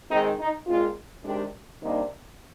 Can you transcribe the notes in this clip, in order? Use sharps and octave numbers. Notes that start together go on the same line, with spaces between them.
D#3 G#3 C4 D#4
D#4
A#2 G#3 C4 F4
C3 D#3 G#3 D4 G4
C3 D#3 G3 A#3 D4 D#4